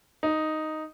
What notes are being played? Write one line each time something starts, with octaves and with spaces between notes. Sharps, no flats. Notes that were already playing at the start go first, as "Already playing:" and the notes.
D#4